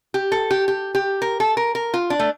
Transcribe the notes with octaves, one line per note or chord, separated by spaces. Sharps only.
G4
A4
G4
G4
G4
A#4
A4
A#4
A#4
F4
D4
A3